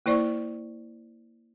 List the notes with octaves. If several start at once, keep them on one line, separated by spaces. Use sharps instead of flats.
A#3 E4 C5 D5 C#6